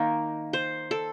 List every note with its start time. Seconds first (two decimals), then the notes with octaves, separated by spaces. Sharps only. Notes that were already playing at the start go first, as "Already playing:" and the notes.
Already playing: D#3 A#3
0.53 C5
0.91 A4